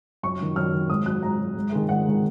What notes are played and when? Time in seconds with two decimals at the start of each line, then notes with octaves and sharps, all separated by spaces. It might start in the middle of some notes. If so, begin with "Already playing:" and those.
0.23 F#2 C#6
0.39 D#3 F#3
0.56 F#2 F6
0.73 D#3 F#3
0.90 G#2 D#6
1.06 F#3 F#6
1.23 G#2 A#5
1.39 F#3
1.56 G#2
1.72 D#3 G#3
1.89 G#2 F#5
2.06 D#3 G#3